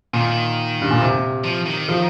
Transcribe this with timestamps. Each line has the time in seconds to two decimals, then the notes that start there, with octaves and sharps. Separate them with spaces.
0.13 A#2 D#3
0.81 G2
0.91 A#2
1.01 C3
1.44 F3
1.66 D#3
1.89 F3